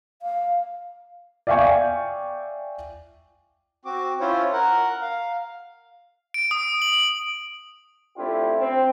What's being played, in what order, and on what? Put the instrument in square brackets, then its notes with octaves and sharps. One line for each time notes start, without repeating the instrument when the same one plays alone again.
[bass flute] F5
[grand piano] D5 E5 F5 G5 G#5 C#6
[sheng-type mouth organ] C4 F#4 D6
C#4 E4 F4 C5 C#5
A#4 F#5
F5
[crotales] D7
D#6
F#7
[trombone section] A3 C4 D4 E4 F4 G4
C4